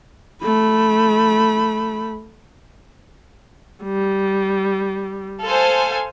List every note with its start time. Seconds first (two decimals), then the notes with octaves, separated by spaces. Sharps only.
0.43 A3 B5
3.84 G3
5.43 A4 C5 F5 G#5